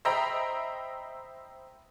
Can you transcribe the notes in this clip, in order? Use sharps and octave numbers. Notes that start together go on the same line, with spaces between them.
C5 D#5 E5 G5 A#5 B5